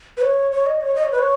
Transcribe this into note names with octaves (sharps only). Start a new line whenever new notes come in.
B4
C#5
C#5
D#5
C#5
D#5
C#5
B4
C#5